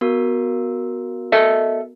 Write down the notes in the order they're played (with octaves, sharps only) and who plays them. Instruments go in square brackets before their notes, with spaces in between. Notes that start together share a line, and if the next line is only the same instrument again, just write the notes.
[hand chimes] B3 F#4 A#4
[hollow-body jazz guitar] A4 D#5 E5